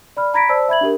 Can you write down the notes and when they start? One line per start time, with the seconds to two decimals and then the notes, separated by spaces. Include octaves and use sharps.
0.17 D5 B5 F6
0.34 A#5 B5 G#6 A#6 B6 D7
0.49 C5 D5 A5 E6
0.68 E5 B5 G#6 F#7
0.81 D4 G4 A#4